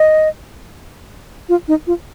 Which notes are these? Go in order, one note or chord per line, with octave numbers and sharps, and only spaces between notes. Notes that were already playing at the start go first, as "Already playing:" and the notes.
Already playing: D#5
F4
D#4
F4